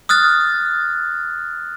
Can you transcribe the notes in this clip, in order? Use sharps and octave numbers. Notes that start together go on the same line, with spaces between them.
D#6 F6 F#6 A6